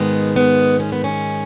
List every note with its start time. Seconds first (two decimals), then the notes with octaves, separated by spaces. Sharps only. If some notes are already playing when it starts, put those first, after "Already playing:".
Already playing: G#2 D#3 G#3 B3
0.36 B3
0.80 C#4
0.92 B3
1.04 C#4